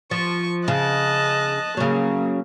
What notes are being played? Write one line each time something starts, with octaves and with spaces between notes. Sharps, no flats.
F3 C#6
C#3 D#5 A5 F#6
C#3 F#3 A#3